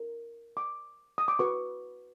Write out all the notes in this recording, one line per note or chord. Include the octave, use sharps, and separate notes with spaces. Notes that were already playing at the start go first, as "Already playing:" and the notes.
Already playing: A#4
D6
D#6
D6
F#4 B4 C#6